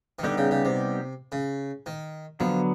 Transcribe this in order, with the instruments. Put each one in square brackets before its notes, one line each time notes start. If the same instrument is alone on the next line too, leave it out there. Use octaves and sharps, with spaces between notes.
[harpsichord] D#3
[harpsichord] D3 [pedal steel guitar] G3 B3 D#4 G4
[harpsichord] C#3
C#3
C3
C#3
D#3
[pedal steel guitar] D3 F#3 B3 [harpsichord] F3